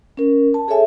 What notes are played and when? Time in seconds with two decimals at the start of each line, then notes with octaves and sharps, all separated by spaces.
0.17 C#4 A#4
0.54 A5
0.68 G#4 A4 C#5 E5 G#5